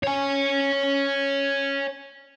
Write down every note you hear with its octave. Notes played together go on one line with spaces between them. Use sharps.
C#5 G#5